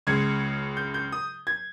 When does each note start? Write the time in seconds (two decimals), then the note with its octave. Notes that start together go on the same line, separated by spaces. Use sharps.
0.07 C#2 C#3 G#3 G#6
0.77 G6
0.94 G6
1.12 D#6
1.47 G#6